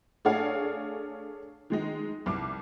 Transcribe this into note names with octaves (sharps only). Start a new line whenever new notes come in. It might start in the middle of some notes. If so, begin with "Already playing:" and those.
A3 D4 G#4 C#5 F5
D#3 G#3 D#4
C2 D6